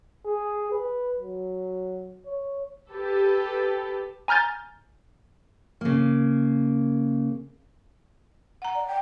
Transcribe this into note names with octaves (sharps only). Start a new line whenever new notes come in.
G#4
B4
F#3
C#5
G4 A4 B4
G#5 A#5 F6 G6 A6
C#3 A#3
F#5 A#5
D5
G5